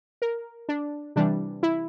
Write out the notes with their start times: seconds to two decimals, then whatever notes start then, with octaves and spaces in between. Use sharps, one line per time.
0.22 A#4
0.69 D4
1.16 C3 E3 G3 D4
1.63 E4